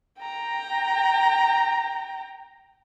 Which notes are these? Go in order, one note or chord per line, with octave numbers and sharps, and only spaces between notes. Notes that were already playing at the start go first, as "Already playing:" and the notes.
G5 A#5